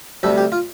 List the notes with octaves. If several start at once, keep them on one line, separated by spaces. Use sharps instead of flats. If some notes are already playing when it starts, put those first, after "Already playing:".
D2 C3 G3 A4
G4
F4